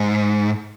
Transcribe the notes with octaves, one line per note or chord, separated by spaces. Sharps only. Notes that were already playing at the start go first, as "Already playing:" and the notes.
Already playing: G#2